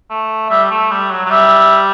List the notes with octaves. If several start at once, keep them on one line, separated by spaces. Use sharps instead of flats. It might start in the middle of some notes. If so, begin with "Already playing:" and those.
A3
G3 E5
A3
G3
F#3
F#3
G3 E5